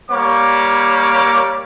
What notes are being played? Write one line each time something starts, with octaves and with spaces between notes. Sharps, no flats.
G3 A#3 C#5 B5 D6